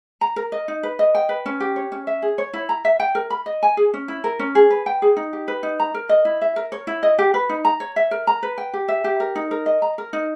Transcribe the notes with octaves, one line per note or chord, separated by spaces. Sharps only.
A#5
A#4
D#5
D#4
B4
D#5
G5
B4
C#4
G4
C#5
C#4
E5
G#4
C#5
E4
A#5
E5
G5
A#4
B5
D#5
G#5
G#4
C#4
E4
A#4
C#4
G#4
B4
G5
G#4
D#4
G4
B4
D#4
A#5
A#4
D#5
E4
E5
A#4
C#5
E4
D#5
G4
B4
D#4
A#5
C#5
E5
A#4
A#5
B4
G5
G4
E5
G4
A#4
D#4
A#4
D#5
A#5
A#4
D#4